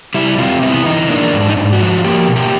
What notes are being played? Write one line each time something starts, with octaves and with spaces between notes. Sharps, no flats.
G3 E4
C3 F4
B3 E4
E3 D#4
A#3 D4
G#2
D4
D#4
G#2 D4
F#4
F3
A#3 G4
B2
G4